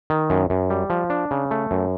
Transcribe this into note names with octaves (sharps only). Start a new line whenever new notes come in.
D#3
F#2
F#2
G3
F3
D4
C#3
A3
F#2